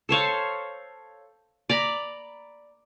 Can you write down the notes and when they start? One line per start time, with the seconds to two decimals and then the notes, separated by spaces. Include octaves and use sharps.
0.09 A4 C5 C#5 F5
1.70 D5 A#5 B5